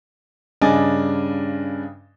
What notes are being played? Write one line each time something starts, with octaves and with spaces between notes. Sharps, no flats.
G2 C#3 D4 D#5 G#5 A6